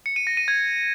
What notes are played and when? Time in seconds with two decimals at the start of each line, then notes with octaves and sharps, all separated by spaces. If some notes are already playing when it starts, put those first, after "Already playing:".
0.06 C#7
0.16 D#7
0.27 A#6
0.37 D#7
0.48 G#6